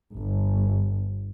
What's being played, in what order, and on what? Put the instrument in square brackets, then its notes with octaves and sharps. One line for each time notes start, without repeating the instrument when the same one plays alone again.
[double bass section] G1